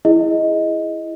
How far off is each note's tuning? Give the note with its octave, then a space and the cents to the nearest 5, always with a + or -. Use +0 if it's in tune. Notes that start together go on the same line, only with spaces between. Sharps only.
E4 +5 G#4 +0 D#5 +10